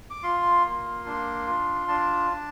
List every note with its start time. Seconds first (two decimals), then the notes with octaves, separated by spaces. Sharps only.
0.10 D6
0.23 F4 C6
0.65 A#3
1.06 D4
1.47 F4
1.88 D4 A5
2.30 D4